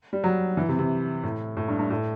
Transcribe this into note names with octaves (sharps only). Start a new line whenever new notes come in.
G3
F#3
E3
C3
C3
A2
A2
G2
G2
A2